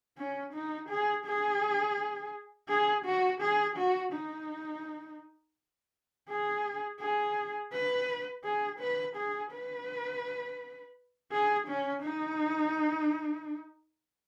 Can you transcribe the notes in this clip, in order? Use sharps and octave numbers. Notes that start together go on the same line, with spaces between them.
C#4
D#4
G#4
G#4
G#4
F#4
G#4
F#4
D#4
G#4
G#4
B4
G#4
B4
G#4
B4
G#4
C#4
D#4